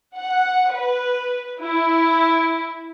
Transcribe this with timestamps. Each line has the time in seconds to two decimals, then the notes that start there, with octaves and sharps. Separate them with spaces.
0.16 F#5
0.72 B4
1.61 E4